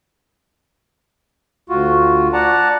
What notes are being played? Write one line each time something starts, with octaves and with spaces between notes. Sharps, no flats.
D2 F4 F#4
D5 F#5 A5 A#5